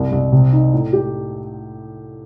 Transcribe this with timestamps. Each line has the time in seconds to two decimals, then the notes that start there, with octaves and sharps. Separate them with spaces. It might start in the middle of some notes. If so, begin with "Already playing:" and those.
Already playing: C2
0.12 C2
0.32 C3
0.53 D#4
0.73 A2
0.93 G4